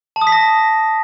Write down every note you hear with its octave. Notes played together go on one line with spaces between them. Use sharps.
A5
D#6
B6
A#6